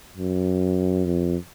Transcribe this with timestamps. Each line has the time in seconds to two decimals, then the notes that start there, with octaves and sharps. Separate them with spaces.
0.16 F#2
1.05 F2